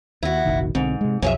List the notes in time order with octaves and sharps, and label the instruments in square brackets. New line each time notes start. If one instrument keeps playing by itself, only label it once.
[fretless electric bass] D#2 [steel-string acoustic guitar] E4 F#4
[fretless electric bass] F1 A#1 D#3
[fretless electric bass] B1 D3 C4 [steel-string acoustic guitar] G#2
[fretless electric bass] C3 G#3
[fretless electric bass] B1 F2 F#3 [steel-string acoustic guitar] C#4 G#4 E5